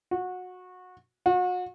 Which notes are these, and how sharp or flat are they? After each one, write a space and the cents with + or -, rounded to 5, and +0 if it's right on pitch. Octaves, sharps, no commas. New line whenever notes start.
F#4 -20
F#4 -35